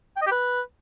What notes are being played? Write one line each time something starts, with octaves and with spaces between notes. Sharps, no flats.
G5
D#5
G4
B4